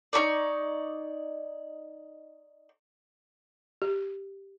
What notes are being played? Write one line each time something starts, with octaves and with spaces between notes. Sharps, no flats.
D#4 E4 C#5 D5
G4